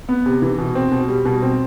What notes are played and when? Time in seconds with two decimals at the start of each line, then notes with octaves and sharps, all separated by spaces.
0.09 B3
0.26 C3
0.42 E3
0.58 B2
0.75 C4
0.91 B2
1.08 G3
1.25 B2
1.42 C4